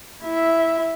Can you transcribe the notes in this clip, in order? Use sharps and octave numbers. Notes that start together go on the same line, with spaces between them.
E4 E5